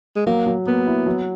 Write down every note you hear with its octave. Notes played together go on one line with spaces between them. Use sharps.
G#3
F#3 A#3
F#3
A#3 B3
E4
F#3